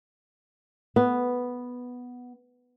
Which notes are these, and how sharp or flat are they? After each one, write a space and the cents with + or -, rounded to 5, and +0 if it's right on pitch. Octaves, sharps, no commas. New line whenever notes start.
B3 +0